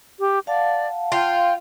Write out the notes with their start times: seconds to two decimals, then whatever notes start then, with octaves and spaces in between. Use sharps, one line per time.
0.19 G4
0.47 D5 F5 F#5 A5
1.12 F4 G5